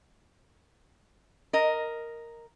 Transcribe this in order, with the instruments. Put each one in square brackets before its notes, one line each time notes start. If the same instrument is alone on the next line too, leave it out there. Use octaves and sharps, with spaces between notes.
[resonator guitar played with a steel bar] A#4 D#5